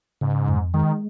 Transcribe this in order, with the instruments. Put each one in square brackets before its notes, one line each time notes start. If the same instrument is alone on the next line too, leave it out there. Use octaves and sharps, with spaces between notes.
[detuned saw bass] G#2 [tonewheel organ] C#3
[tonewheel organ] F2
[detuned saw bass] D#3 [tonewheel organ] G#3